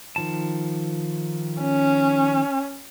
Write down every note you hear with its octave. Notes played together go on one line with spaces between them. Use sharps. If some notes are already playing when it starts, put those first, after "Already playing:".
D#3 F3 A5
C#4